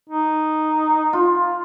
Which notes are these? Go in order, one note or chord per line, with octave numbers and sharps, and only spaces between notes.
D#4
F4